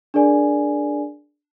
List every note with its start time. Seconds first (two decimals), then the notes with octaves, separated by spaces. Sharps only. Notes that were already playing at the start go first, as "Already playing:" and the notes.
0.14 D4 G#4 A#4 D5 G#5